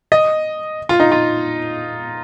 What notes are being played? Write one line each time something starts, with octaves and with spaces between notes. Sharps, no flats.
D#5
F4
D#4
F4